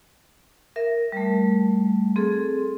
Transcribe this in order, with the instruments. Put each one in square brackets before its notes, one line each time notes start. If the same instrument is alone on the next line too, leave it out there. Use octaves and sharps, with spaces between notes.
[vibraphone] A#4 E5
G3 A3
C4 G#4 A4